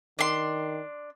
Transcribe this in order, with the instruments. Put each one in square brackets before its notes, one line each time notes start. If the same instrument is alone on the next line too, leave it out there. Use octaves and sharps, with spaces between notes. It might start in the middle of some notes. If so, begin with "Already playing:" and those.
[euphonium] D#3 [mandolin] D4 C6